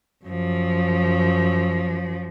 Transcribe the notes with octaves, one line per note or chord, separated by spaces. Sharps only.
F#2 F3